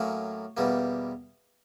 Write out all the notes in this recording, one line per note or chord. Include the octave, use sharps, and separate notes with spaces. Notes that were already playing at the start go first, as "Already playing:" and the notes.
Already playing: A2 F#3 A#3 C#4 C#5
E2 B2 G3 A#3